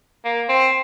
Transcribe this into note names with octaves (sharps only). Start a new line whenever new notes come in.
A#3
C4